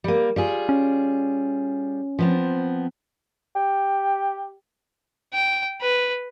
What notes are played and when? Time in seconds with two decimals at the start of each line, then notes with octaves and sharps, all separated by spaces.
0.04 G3 A#3
0.36 G3 F4 G#4
0.69 C#4
2.19 F3 B3 C4
3.55 G4
5.34 G5
5.81 B4